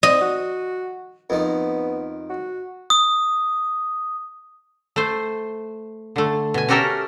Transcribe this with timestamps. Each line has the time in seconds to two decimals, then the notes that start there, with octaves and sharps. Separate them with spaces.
0.03 C4 D#5
0.21 F#4
1.30 F2 D#3 B3
2.30 F#4
2.90 D#6
4.96 A3 C5
6.16 D3 A3
6.54 B2 G#5
6.68 C#4 F#4 G4 A4 A#4 E5